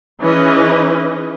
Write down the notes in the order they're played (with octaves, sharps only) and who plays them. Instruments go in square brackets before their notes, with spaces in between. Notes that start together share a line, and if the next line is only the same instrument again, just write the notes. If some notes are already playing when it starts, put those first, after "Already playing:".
[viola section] E3 C#4 D#4 G#4 B4 D#5